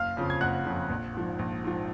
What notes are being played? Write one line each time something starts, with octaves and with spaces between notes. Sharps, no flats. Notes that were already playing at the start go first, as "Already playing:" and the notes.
Already playing: F#1 F5 F6
F2 C#3 F3
G#6
F#1 F#5 F#6
F2 C#3 F3
A#1
G#2 F3
A#1
G#2 F3